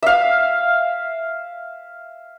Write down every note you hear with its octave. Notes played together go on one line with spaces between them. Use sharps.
E5 F5